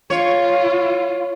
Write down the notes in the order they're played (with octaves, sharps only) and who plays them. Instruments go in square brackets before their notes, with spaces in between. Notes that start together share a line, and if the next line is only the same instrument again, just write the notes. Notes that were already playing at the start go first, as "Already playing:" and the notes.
[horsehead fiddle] F4 [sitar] C#5